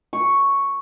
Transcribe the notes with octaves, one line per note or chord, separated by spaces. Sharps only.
C#6